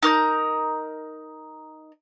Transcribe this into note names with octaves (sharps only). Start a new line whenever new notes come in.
D#4 A#4 D6 G6